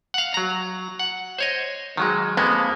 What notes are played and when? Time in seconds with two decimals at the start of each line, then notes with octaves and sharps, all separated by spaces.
0.14 F5 F#5
0.34 F#3 A#5
0.99 F#5
1.39 C5 C#5 D#5
1.97 D#3 F#3 G#3
2.37 F2 G#3 A#3 B3